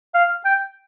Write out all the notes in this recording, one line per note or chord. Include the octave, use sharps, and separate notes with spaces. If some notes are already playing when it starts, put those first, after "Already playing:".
F5
G5